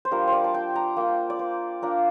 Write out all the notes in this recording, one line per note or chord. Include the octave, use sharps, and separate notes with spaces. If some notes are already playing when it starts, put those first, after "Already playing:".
C5
G3 D4 F4 A#4
C5
D5
A5
G5
A#5
A#3 F4 G5
D5
C5
A#3 D4 F4 A#4